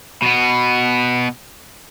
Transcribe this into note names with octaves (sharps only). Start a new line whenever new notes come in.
B2 B3